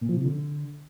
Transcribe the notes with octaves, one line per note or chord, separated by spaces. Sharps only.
A#2
F3
C3
D3